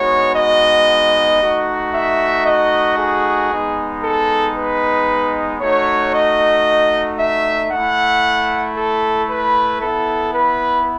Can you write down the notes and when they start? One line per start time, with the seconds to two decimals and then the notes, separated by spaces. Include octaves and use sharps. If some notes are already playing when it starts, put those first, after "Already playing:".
Already playing: G#3 B3 D#4 F#4 C#5
0.36 D#5
1.42 A3 D#4 F#4
1.94 E5
2.47 D#5
2.98 G#4
3.51 G#3 B3 D#4
4.03 A4
4.56 B4
5.61 A3 D#4 F#4 C#5
6.14 D#5
7.19 E5
7.71 A3 E4 F#5
8.76 A4
9.29 B4
9.81 B3 E4 A4
10.34 B4